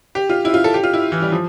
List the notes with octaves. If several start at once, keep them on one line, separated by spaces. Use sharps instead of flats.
G4
F4
E4
F4
A4
G4
F4
E4
E3
G3
F3